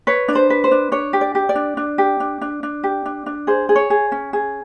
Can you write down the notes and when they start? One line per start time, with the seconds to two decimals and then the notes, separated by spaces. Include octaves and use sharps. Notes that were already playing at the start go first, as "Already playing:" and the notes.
0.07 B4 C#5
0.28 D4
0.35 C5
0.50 B4
0.64 C5
0.71 D4
0.92 D4 C#5
1.13 G4
1.21 D5
1.35 G4
1.49 D5
1.55 D4
1.77 D4
1.98 G4
2.20 D4
2.41 D4
2.63 D4
2.83 G4
3.06 D4
3.26 D4
3.47 G#4 C5
3.69 G#4
3.76 C#5
3.90 G#4
4.12 C#4
4.33 G#4